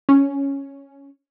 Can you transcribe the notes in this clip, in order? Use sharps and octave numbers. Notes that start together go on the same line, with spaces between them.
C#4